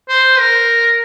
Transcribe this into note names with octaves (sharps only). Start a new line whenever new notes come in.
C5
A#4